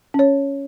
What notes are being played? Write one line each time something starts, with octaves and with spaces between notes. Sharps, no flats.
C#4 C#5